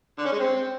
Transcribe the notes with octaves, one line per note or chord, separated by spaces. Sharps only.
D3
C#4
G#3
C4